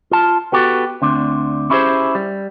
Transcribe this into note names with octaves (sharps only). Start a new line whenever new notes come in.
F4 A5
B3 F#4 G4 A4
D2 C4 D4
C#4 E4 G4 G#4 C5
G3